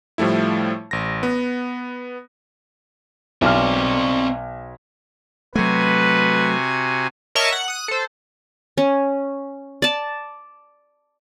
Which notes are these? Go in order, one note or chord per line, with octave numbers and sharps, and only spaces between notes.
A2 F3 G3 A3 E4
A1 A#6
B3
B1 C4 D5 F6
C3 F#3 A3 F#4 B4 G#5
A#4 C#5 D#5 E5 A5 C#6
F#5
D#6 F#6
A4 C5
C#4
D5 A5